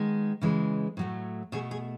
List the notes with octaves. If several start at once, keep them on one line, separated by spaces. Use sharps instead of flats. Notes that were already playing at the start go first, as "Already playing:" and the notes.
Already playing: D#3 G#3 B3
C#3 E3 G#3
A2 F#3 A3
B2 A3 G#4
G#4